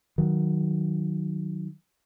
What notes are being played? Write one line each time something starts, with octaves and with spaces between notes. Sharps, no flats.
D#3 F#3